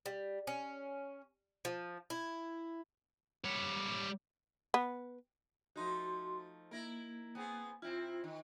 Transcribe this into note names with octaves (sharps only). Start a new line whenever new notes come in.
G3
C#4
F3
E4
G3 C#5
B3
F3 A3 D#4 F#4 C6
A#3 E4 A#4
B3 C4 G#4
C3 C4 E4 F4
D#3